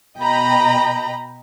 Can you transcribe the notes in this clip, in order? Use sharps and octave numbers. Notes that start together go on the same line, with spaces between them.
B2 D#5 G5 A#5 B5